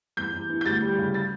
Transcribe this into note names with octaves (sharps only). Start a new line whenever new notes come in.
E2 G6
E2
E3
G6
D2 A6
G3
C#3
A6